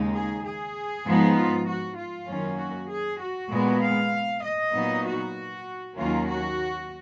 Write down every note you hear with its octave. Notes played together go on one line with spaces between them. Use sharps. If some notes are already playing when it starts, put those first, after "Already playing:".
Already playing: D#2 C#3 G#3 D#4
G#4
G#4
G#2 F3 B3 D#4
F4
F#4
F4
F#2 D#3 F#3 A#3 C#4
F#4
G#4
F#4
A#2 G#3 B3
F5
D#5
A#2 F#3 B3 D#4
F#4
D#2 D#3 F#3 A#3 C#4 F4
F#4